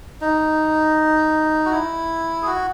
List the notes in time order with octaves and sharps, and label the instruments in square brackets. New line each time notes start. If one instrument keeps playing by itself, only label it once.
[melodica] D#4
F#4
E4
G#4
F#4